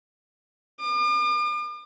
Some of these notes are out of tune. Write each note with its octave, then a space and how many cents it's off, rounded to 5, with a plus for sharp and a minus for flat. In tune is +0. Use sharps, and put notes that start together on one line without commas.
D6 +45